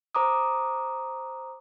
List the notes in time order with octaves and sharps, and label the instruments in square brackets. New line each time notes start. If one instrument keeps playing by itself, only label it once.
[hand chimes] C5 A#5 D6 D#6